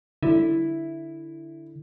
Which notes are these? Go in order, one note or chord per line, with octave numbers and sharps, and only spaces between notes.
D3 E4